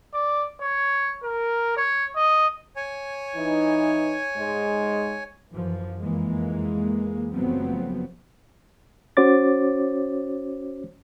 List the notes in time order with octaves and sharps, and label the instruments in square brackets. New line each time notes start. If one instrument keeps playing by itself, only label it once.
[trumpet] D5
C#5
A#4
C#5
D#5
[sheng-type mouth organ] C#5 G#5
[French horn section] E3 D#4
G#2 G#3
[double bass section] F#2 E3 F3
F2 E3 G#3 A#3
F#1 F3 F#3 A3 B3 C4
[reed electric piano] C#4 F#4 C5 C#5 D6 A6